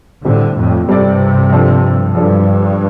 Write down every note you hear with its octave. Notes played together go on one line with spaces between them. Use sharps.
A2 D3 G3 C4 A4 D5
F2 A2
G2 C3 G3 C4 A4 D5
F3 D4 A4
G2 F3 D4 A4